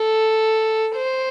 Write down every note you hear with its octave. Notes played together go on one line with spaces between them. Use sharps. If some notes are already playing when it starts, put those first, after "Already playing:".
Already playing: A4
C5